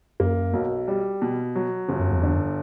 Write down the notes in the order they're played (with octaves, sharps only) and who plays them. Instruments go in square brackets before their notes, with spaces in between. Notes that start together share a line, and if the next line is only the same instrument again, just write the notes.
[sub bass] F#2 [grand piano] A#3
[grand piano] B1
G3
B2
F#3
G1
[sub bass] F#2
F2
[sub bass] E2 [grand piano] D3
[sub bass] F#2